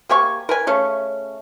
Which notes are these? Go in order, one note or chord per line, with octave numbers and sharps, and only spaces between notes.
A#3 G4 G#5 C#6
A#4 B4 G#5
C#3 A3 C#4